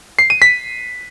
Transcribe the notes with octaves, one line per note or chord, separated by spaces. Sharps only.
C7
D#7
B6